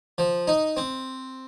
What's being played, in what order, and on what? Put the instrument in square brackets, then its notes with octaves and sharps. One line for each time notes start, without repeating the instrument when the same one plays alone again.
[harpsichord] F3
D#4
C4